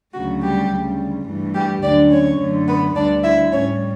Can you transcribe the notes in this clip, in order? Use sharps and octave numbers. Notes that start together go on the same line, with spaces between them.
D2 C#3 F#3 A3 F#4
G3 G4
D2 C#3 G3
G2 E3 A3
G3 G4
D2 D3 F#3 D4 D5
C#4 C#5
F#2 D3 A3
B3 B4
D2 D3 G3 D4 D5
E4 E5
A2 G3 C#4 C#5